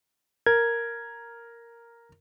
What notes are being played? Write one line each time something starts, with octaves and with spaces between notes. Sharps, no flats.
A#4 G#6